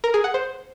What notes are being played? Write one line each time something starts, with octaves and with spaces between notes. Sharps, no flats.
A#4
G#4
F#5
C5